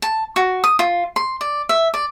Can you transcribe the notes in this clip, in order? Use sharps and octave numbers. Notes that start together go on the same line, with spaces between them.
A5
F#4
D#6
F4
C6
D5
E5
D5